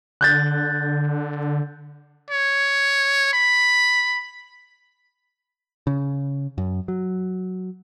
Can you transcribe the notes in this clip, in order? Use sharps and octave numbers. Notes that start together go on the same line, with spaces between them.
D3 F#6 G6 A6
C#5
B5
C#3
F#2
F#3